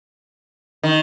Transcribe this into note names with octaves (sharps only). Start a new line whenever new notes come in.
D#3